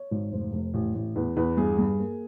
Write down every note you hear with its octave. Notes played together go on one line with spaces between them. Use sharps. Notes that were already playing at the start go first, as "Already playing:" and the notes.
Already playing: C#5
G#1
F1 C5
F1
A1
A1
E2 B4
E2 B4
G2 G#4
G2
A#3